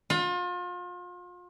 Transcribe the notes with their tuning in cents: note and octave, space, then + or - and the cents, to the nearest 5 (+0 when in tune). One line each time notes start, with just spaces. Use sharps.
F4 +35